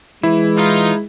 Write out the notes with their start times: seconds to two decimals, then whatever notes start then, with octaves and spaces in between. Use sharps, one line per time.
0.23 E3 G#3 E4
0.57 D#4 F4